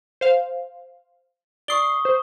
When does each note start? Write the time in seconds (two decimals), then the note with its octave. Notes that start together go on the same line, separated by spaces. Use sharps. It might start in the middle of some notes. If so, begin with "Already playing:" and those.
0.21 C5 F5
1.68 D5 C#6 D#6 C7 G7
2.05 C5